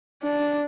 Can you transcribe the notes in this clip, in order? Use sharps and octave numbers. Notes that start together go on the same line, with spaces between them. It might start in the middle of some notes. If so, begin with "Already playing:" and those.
D4